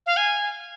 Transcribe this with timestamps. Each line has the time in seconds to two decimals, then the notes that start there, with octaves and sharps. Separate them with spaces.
0.06 F5
0.17 G#5